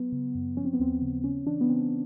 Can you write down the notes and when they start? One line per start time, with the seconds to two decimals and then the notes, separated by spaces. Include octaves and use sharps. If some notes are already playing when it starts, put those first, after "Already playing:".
Already playing: F#3 B3
0.12 C#3
0.35 F#2
0.57 F3 C#4
0.65 C4
0.73 B3
0.79 D#2 C4
1.02 C#3
1.24 C#3 C#4
1.46 E3 D4
1.61 B3
1.69 C#3 C4